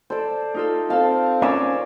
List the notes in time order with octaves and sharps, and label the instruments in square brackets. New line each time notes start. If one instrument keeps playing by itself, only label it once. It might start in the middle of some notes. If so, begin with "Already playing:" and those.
[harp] A4 [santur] C5 D5
[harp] D#4 F4 A4
[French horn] C4 [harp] A4 A5 [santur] F5
[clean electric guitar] C#4 [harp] A#4 [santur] D5 E6